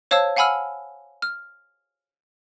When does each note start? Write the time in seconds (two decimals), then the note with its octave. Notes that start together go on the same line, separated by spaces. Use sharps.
0.11 C5 C#5 F5 A5 E6
0.36 F5 F#5 G#5 B5 E6 F6
1.22 F6